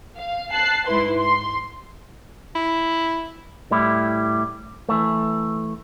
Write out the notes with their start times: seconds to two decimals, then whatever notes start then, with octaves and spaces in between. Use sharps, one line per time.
0.17 F5
0.52 A5 F#6 C7
0.87 G#2 E4 B4 C6
1.18 C6
2.55 E4
3.71 A2 G3 E4
4.89 E3 A3